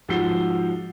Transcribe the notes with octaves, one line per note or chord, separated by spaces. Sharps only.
G#2 F3 F#4 E6 C7 G7